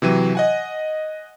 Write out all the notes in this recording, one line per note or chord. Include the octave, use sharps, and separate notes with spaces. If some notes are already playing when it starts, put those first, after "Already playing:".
C3 E3 F#3 D#7
D#5 F#5 G#5